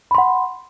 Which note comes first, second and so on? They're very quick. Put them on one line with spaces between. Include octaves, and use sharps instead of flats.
B5 C6 F#5